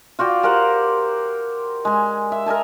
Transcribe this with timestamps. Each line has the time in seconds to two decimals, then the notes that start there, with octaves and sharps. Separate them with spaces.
0.19 F4 F#4 D5 G5
0.43 G4 A#4 C5 F#5
1.85 G#3 G#5
2.32 E5
2.46 A#4 D#5 G#5 A5